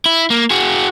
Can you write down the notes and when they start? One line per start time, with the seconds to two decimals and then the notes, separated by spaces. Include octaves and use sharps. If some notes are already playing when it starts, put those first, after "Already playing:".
0.06 E4
0.30 A#3
0.51 F#4 G#4